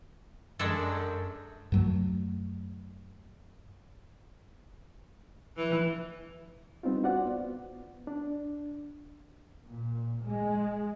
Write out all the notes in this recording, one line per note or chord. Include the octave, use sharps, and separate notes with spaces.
F#2 G#3 D4 A4
F#2 F#3 A3
E3
G3 B3 C4 D4 D#4 F4
F4 F#4 C5 D5 F#5
B3
D4
A#2
G#3